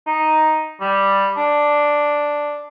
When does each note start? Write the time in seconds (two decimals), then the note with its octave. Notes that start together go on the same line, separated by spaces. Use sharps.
0.07 D#4
0.81 G3
1.37 D4